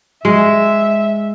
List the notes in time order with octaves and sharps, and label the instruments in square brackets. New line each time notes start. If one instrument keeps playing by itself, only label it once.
[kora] G#3 [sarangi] E5